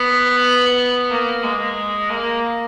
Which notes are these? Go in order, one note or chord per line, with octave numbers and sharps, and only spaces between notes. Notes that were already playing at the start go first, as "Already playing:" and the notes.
Already playing: B3
A#3
G#3
A#3